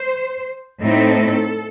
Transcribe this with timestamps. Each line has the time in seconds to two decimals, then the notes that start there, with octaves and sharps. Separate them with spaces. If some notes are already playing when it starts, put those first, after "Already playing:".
Already playing: C5
0.82 A2 A3 C4 D#4 A4